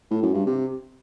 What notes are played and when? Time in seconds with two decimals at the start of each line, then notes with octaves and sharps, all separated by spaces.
0.11 A2
0.23 F#2
0.34 G2
0.46 C3